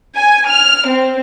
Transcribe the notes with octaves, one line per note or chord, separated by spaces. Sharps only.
G#5
F6
C4